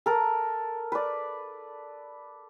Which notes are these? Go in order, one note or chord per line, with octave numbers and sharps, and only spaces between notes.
A4 A#4
B4 D5